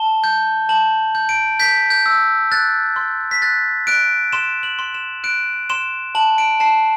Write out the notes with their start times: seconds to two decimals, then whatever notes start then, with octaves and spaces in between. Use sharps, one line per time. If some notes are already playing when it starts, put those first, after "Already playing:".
Already playing: A5 G7
0.24 G6
0.69 A5 F#7
1.15 G6
1.29 D7
1.59 G6 B6
1.90 G6
2.06 E6
2.52 F#6 A6
2.96 C6
3.31 B6
3.42 F#6 A6
3.87 F#6 D7
4.32 C6 E7
4.63 F#7
4.79 C6
4.94 E7
5.24 F#6 D7
5.70 C6 E7
6.15 A5 F#7
6.38 D7
6.60 A5 C7